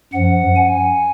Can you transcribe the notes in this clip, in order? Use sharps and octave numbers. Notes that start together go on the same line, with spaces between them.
F#2 F3 F#5
G#5